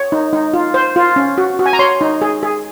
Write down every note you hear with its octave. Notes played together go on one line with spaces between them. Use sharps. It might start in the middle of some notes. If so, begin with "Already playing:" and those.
Already playing: C#5
D#4
D#4
F4
C5
F4
C#4
F#4
F#4
G#5
A#5
C#5 C6
D#4
G#4
G#4